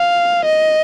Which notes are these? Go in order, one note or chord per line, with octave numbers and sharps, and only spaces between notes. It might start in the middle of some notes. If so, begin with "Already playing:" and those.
Already playing: F5
D#5